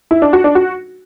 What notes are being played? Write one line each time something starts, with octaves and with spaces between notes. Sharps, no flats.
E4
D4
F#4
D4
F#4